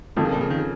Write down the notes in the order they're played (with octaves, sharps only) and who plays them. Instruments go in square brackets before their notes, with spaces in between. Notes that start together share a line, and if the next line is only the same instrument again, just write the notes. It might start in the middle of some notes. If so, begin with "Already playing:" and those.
[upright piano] F2 F3 A#3 [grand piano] D#3
[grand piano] C#3
A#2
C#3
D#3
C#3